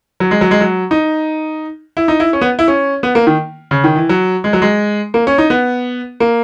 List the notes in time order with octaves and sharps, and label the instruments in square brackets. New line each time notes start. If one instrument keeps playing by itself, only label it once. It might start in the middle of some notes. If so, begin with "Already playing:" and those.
[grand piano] F#3
G#3
F#3
G#3
F#3
D#4
E4
D#4
E4
C#4
B3
E4
C#4
B3
A#3
D#3
C#3
D#3
E3
F#3
G#3
F#3
G#3
A#3
C#4
D#4
B3
A#3